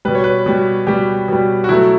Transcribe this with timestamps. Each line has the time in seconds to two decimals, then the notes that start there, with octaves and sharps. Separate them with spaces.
0.05 B2 G3 B4
0.15 C#5
0.24 B4
0.46 B2 G3
0.87 B2 G3 G4
1.28 B2 G3
1.64 F#4
1.69 B2 F#3 A3 E4